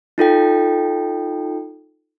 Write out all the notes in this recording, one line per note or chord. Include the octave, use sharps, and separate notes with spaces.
D#4 F4 A4 G5